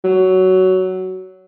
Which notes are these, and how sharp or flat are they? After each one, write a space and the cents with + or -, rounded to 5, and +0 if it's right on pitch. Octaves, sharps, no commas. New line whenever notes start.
F#3 +15